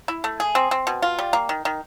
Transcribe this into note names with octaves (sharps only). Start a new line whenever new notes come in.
E4
A3
G#4
C4
C4
B2
F4
G3
A#3
D#3
D#3